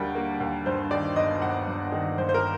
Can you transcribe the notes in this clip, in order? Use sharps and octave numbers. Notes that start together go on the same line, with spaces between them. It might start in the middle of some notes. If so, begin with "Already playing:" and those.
Already playing: D#2 D3 G3 A#3 F#5 G5
A#3
D#2
G2 C5
D#3 D5
G1 D#5
G1 F#5
G2
D#3
G1 C5
C5
A#4